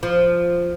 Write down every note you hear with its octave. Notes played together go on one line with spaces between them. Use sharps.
F3